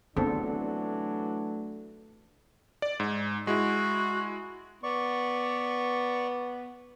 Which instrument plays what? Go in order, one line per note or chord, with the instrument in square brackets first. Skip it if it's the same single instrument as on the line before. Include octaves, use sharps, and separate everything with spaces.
[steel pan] D3 C4 A4 [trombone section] E3 F#3 D4 [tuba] A3 [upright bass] B3
[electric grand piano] D5
G#2
[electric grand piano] G#3 E4 [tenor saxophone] F#4
[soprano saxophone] B3 [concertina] D5 C#6